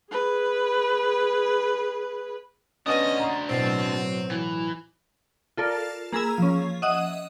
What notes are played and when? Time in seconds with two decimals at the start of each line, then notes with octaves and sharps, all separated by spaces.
0.11 G#4 B4
2.87 B3 C#4 D4 F#4 D#5
3.20 A#5 C6
3.49 D1 B2 F#3 C4
4.31 E3
5.57 F4 A4 A#4 D5
6.13 A#3 G#4 A#5 B5 E6 G#6
6.38 F3 C#4
6.82 D#5 E5 F#5 D#6